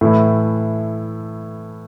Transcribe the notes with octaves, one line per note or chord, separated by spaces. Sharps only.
A2 E3 A3 E4